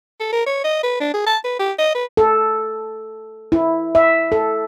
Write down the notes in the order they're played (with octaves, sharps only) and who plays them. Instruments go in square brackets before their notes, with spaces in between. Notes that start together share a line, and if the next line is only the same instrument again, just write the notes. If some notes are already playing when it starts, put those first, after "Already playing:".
[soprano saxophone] A4
A#4
C#5
D#5
B4
D4
G#4
A5
B4
G4
D#5
B4
[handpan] A4
E4
E5
A4